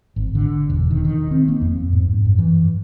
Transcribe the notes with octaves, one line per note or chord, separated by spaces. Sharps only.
G#1
D3
E1
D#3
D#3
C4
A#3
F2
G#2
F#2
E3